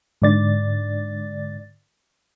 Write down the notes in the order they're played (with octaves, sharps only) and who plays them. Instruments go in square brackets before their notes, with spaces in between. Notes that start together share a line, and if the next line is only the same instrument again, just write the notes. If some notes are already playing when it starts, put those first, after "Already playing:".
[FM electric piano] G#2 D3 D5 A6